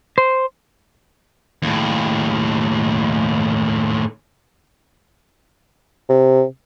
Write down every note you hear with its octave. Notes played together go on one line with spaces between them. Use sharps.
C5
D#2 A2
C3